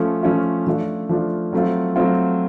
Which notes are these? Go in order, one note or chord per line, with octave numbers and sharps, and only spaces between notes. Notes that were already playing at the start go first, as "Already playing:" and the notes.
Already playing: F3 A3 C#4 F4
F3 A3 C#4 F4
F3 A3 D4 F4
F3 A3 D4 F4
F#3 A3 C4 F4
F#3 A3 C4 F4